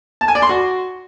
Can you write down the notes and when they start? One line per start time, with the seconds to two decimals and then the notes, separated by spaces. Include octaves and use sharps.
0.21 A5
0.28 G#5
0.35 D5
0.42 C6
0.49 F#4